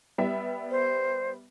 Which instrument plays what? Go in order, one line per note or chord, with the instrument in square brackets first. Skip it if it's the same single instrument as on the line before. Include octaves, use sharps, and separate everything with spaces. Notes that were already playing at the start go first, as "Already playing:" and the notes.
[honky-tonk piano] G3 B3 E5
[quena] C5